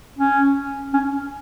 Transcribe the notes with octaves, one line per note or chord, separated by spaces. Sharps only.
C#4
C#4